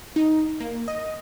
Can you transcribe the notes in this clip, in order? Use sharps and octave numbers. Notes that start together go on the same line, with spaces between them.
D#4
A#3
D#5